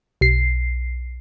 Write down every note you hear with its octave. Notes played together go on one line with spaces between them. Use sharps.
B1 C7